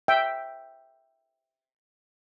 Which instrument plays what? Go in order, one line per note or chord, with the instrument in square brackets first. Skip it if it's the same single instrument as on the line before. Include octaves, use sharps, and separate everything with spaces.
[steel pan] E5 G5